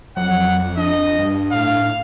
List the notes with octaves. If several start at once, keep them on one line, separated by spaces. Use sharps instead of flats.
F2 F#3 F#5
D4 D#5
G2
A2 F5